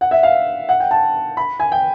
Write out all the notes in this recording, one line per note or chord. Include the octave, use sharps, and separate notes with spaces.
F#5
E5
F5
F#5
G5
A5
B5
G#5
G5